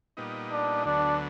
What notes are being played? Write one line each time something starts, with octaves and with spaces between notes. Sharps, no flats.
A#2 G3 B3 D#4
D4
D2 D3 F#3 B3 D4